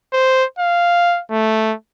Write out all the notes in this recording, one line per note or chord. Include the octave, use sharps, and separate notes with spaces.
C5
F5
A3